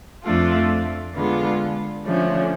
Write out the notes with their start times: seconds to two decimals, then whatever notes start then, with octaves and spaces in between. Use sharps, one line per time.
0.23 F2 F3 A3 D4 F4
1.15 D3 G#3 B3 F4
2.05 D3 F3 A3 C#4